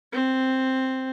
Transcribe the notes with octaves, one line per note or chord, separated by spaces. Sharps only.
C4